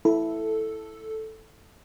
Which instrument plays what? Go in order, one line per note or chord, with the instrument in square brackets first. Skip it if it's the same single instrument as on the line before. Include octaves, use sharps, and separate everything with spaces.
[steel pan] E4 [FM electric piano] A4